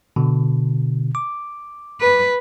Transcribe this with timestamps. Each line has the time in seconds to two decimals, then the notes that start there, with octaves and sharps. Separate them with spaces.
0.16 B2 D3
1.15 D6
2.00 B4